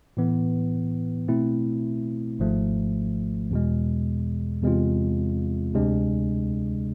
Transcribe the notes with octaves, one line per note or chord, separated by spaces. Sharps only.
A2 E3 B3
B2 A3 C4 E4
G#1 G#2 F3 A3
E2 B2 G#3
E2 C3 G#3 C4 F4
D2 C3 G#3 D4